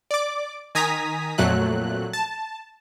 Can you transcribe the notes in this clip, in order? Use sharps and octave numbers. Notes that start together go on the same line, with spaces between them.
D5 D6
D#3 G#5 A#5 D#6 B6
F2 A#2 F#3 A3 F#6
A5